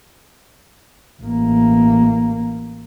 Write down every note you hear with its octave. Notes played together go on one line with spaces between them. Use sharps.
A1 A#3